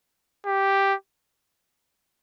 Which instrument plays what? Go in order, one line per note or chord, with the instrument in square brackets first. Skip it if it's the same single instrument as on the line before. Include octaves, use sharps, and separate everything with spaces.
[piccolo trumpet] G4